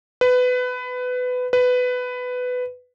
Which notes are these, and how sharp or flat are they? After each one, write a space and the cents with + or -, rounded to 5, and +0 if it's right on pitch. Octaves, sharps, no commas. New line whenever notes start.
B4 +20
B4 +15